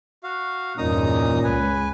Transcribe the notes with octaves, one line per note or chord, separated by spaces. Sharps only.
F#4 F5
E2 G2 A#2 C#4 D#4 A#5 D#6
C#2 B4 G#5